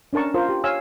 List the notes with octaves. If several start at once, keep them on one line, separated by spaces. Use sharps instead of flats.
C#4 D4 A#4 A5 C#6
F4 A#4 C5
G4
C#5 F5 G#5 E6